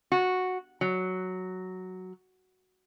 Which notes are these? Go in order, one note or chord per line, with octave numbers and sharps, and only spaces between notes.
F#4
F#3